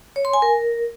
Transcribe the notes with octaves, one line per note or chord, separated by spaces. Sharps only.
C#5
C6
G#5
A#4